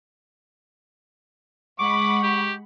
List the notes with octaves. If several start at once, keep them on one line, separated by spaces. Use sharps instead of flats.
G#3 F#5 B5 C#6 D6
G4